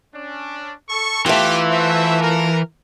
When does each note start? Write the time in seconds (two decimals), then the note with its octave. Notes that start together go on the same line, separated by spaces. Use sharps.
0.14 C#4 D4
0.89 A4 C#6
1.26 E3 A3 F4 G4
1.71 F#4 C5 E5
2.21 A#4